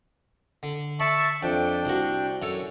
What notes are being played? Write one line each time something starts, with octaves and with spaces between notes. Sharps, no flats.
D3
D5 E5 A5 C#6
F2 D4 G5
C2 F#4
F#2 A4 C#5